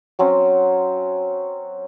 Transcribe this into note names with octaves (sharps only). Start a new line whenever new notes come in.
F#3 C4 C#4